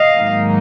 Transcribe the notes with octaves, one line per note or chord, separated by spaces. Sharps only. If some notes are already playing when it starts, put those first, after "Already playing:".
Already playing: D#5 F5
G#2 D#3 F#3 A#3 D#4